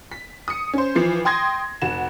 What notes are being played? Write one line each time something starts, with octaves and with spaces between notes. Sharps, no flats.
B6
D#6 C#7
C#4 C5
E3 F3 C7
G5 C6 D#6 G#6 A#6
F1 F#4 E7